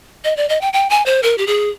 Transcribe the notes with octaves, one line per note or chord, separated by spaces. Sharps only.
D#5
D5
D#5
G5
G5
G#5
C5
A#4
G4
G#4